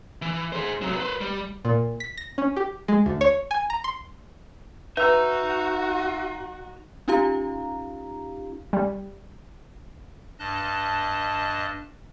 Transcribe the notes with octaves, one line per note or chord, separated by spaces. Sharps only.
E3
G#4 C5
C3 F#3
B4 C5
G3
A#2
B6
A#6
C#4
G4
G#3
D2
C#5
G#5
A#5
C6
D#4 F#4 B4 E5 A#5 E6
C#4 D#4 F4 G4 F5 A#5
G3
G2 D#5 A5 F#6